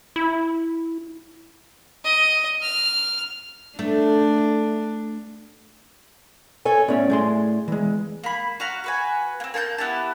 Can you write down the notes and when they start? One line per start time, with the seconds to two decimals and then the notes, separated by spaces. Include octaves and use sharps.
0.16 E4
2.04 D#5
2.62 F6
3.79 A3 D4
6.65 A4 C#5 G#5
6.88 A2 B3 C#4 C#5 D5
7.10 A3 G#4 C6
7.68 E3 G#3
8.24 A#3 B5
8.60 F#4 F5 A#5 B5
8.84 F#4 B4 G#5
9.40 A#3 C4
9.54 A#3 A5 C#6 G6
9.78 B3 E4 G4 A5